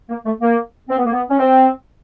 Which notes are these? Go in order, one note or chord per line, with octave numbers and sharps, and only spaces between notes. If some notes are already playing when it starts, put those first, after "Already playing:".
A#3
A3
A#3
C4
B3
A#3
B3
C#4
C4